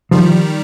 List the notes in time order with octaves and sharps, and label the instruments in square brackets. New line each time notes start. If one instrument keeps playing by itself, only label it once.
[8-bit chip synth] D#3 G3 [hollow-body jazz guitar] F3